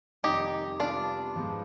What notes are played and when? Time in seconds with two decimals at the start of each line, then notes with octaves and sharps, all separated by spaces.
0.23 F2 C3 D#3 G3 D#4 G4
0.80 C3 G3 B3 D4 F4
1.36 G#2 F3 G#3 B3 D#4